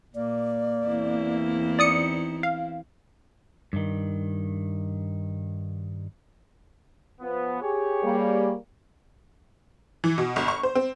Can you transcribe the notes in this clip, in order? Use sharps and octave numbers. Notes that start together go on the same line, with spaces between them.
A#2 A#3 D5
E2 C4 E4
D#4 D5 D#6 C#7
F5
G2 D#3
F3 B3
G4 G#4 C#5
G3 A#3
E3
B2
G1
C#6
C5
C4